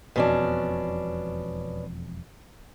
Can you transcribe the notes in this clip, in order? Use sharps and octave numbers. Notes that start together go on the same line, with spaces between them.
E1 F2 B2 C#4 D4